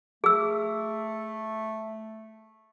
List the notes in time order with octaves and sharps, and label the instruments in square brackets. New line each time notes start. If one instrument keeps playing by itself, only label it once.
[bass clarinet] A3 [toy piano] G#4 E6